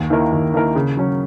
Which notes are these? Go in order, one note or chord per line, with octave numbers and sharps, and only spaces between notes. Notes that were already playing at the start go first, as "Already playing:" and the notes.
Already playing: D#2
D#3 A#3 E4 A#4
D#2
D#3 A#3 E4 A#4
C#3
F#3 C#4